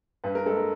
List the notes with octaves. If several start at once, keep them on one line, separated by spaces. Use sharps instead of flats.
G2 B4
A#4
G#3 A4
A#4